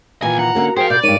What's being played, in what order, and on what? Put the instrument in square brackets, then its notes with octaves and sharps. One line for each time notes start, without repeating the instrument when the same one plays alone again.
[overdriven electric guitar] B1 G#5 [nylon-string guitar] A#2 D#3 E3
[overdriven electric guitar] F#5 [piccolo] A#5
[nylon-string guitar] D3 A#3 C#4 [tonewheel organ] F#4 A#4
[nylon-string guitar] G#4 [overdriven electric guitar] C5 F5 [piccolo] G5
[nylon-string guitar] B2 [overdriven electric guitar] D5 [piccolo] G6
[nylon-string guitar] G2 C#5 [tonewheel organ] G#3 D#4 A#4 [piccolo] D#7